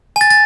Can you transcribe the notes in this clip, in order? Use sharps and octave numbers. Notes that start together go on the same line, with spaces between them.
G#5 A6
A6